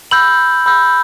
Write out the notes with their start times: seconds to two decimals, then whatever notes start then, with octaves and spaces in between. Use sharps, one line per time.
0.11 B5 E6 G6 F#7
0.66 B5 E6 G6